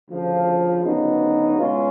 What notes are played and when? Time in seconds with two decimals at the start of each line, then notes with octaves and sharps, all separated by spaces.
0.08 D2 C#3 F3
0.83 D2 C#3 F#3 B3 D#4
1.56 B2 G#3 C#4 F4